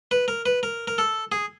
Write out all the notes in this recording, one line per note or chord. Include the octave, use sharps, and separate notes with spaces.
B4
A#4
B4
A#4
A#4
A4
G#4